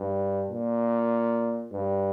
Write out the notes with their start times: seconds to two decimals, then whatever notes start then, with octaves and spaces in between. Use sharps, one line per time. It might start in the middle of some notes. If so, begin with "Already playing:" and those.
Already playing: G2
0.50 A#2
1.72 G2